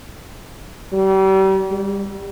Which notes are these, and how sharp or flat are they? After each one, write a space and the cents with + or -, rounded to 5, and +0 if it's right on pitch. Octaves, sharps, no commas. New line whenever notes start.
G3 -35
G3 +20